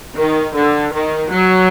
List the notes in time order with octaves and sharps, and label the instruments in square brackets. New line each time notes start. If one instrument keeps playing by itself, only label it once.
[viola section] D#3
D3
D#3
F#3